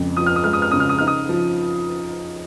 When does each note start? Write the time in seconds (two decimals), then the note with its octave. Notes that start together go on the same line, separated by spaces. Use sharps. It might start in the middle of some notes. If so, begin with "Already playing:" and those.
Already playing: F2 C#3 G#3
0.17 F3 D#6
0.26 F6
0.36 D#6
0.44 G#3 F6
0.53 D#6
0.62 F6
0.71 C#3 D#6
0.80 F6
0.89 D#6
0.98 D#4 F6
1.07 D#6
1.29 F3